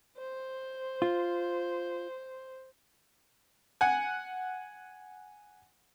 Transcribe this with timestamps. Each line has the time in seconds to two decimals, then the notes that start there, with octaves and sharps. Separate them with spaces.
0.17 C5
1.02 F4
3.81 F#5 G#5